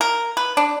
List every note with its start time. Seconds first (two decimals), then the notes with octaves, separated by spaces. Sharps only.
0.01 A#4
0.37 B4
0.57 D4